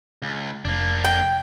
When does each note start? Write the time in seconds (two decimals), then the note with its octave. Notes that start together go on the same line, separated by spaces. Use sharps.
0.22 C#2
0.65 F1 A#3 D4
1.05 G5